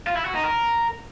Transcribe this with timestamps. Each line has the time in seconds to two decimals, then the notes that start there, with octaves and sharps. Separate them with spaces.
0.07 F4
0.16 E4
0.25 F#4
0.35 D#4
0.44 A#4